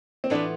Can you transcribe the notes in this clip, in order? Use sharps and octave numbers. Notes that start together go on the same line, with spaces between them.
C4
A2 E3 B3 D4 F4 B4